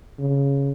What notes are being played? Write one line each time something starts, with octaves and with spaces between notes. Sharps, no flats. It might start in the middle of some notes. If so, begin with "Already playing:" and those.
C#3